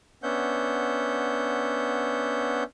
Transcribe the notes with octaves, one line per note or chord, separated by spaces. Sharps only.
B3 C#4 D4 E5 F#5 G6